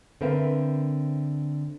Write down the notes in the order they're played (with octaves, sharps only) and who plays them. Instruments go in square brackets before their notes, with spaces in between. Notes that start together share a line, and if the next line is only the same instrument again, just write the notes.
[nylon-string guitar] D3 C4 A#4 B4 E5 F5